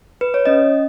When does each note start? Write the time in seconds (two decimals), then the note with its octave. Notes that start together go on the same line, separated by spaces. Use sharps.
0.21 B4
0.34 C#5
0.46 C#4 D#5